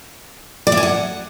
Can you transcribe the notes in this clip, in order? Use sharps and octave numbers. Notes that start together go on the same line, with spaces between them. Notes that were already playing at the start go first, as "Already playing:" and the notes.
D5
E5
G#5
F#5